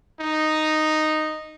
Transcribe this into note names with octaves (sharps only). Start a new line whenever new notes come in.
D#4